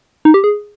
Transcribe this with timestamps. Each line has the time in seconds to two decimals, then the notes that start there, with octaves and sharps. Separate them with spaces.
0.25 D#4
0.34 G4
0.44 G#4